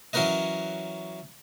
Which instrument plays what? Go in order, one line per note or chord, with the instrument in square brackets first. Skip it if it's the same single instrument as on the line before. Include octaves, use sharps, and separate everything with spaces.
[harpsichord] E3 F#3 C#4 A#4 B4 D#5